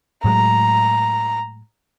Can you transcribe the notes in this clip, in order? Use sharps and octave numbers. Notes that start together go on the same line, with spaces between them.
A2 F#3 G#3 A#5